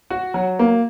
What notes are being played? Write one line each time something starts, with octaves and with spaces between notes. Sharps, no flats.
F#4
F#3
A#3